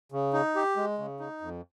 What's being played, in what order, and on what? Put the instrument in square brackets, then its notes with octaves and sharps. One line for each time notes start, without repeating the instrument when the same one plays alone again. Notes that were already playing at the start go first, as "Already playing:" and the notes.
[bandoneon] C#3
D#4
G4
G#3
C#3
D#4
F2